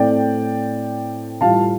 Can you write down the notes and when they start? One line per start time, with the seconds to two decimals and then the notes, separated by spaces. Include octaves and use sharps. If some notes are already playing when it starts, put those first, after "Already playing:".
Already playing: A2 A3 C4 D5 G5
1.41 A2 G3 F4 F5 A5